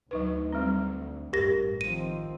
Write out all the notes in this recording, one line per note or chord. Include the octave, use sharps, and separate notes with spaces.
D2 F#3 D#4 B4
G3 C4
A1 G2 G4 A#4 A#6
D#3 F3 C4 D#7